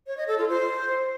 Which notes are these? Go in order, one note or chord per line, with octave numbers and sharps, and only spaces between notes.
C#5
D#5
A4
F4
C5